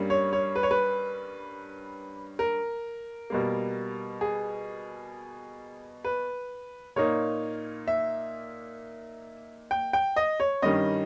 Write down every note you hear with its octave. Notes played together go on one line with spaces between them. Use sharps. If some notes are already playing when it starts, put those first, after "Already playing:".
Already playing: G2 G3 A#3 C#4
C#5
C#5
B4
C#5
B4
A#4
B2 G3 A#3
G#4
B4
A#2 A#3 D#4 C#5
E5
G5
G5
D#5
C#5
G2 D#3 G3 C#4 D#5